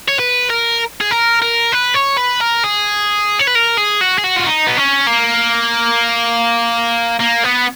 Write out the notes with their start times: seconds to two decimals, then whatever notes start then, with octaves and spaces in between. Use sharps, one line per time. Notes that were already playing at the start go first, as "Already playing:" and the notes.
0.08 C#5
0.19 B4
0.50 A#4
1.01 G#4
1.11 A#4
1.42 A#4
1.73 B4
1.95 C#5
2.17 B4
2.41 A#4
2.64 G#4
3.39 C#5
3.47 B4
3.55 A#4
3.78 G#4
4.01 F#4
4.18 G#4
4.24 F#4
4.36 F4
4.47 D#4
4.67 B3
4.77 C#4
5.07 A#3
7.20 A#3
7.44 B3